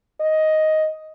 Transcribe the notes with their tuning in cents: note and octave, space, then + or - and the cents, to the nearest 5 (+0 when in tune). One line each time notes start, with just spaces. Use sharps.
D#5 +10